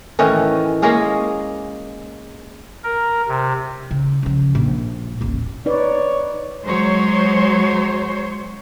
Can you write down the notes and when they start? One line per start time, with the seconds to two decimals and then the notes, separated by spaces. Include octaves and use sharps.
0.19 A2 D#3 E3 C#4
0.82 G#3 A#3 C#4 G#4
2.84 A#4
3.28 C3
3.91 C#3
4.23 C#3 F3
4.55 A#1
5.21 D#1 A1
5.66 D#4 B4 C#5 D5
6.65 F#3 G#3 C5 C#5